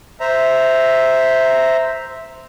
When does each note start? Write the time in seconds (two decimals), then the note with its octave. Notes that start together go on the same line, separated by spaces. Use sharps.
0.20 C5 E5 A#5